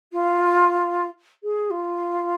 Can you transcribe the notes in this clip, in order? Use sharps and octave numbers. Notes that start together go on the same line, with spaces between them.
F4
G#4
F4